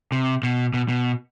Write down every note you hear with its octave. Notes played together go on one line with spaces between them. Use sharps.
C3
B2
B2
B2